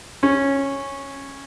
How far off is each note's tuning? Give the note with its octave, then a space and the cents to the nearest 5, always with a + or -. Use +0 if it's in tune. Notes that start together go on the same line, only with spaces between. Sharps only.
C#4 -10